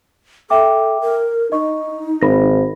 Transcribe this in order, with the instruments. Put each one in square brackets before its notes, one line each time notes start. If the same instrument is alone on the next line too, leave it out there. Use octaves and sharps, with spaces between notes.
[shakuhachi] A4 [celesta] E5 G5 D6
[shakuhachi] A#4
[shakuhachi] D#4 [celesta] D#5 C#6
[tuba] G#1 [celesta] B5 A#6